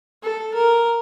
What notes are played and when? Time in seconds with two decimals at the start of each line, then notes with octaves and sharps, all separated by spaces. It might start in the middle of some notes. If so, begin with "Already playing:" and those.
0.23 A4
0.54 A#4